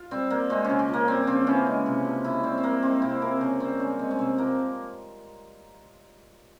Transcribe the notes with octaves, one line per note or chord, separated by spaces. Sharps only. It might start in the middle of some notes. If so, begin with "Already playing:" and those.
Already playing: F4
G3 C4
G3 A#3
G#3 C4
C#3 C#4
C#4
F3 A#3
G3 C4
C#3 C4
E3 C#4
G#3
C3
F3
C#3 E4
G3 C4
C4
G3 A#3
G#3 C4
C3 E4
F3 A#4
C#3 C#4
G3 C4
G3 C#4
G#3 C4
C#4
C3 C4
F3 A#3